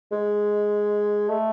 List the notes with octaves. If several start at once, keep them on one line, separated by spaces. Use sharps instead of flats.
G#3
A3